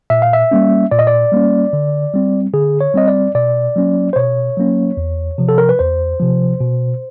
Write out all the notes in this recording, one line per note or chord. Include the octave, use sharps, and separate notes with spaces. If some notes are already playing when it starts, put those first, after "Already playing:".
A#2 E5
F5
E5
G3 A#3 C#4
A#2 D5
D#5
D5
G3 A#3 C#4
D3
G3 C4
D3 G#4
C#5
G3 C4 D#5
D5
B2 D5
F#3 A#3 C#4
C5
B2 C#5
F#3 A#3 C#4
E2
C3 F3
A4
A#4
B4
E2 C5
C3 F3
B2